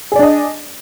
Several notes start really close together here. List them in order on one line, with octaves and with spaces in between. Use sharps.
G#4 D5 D4 D#5